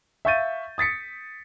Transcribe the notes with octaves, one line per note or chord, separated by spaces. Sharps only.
E5 F5 C#6 G6 A6 D#7
D#6 A6 B6 C#7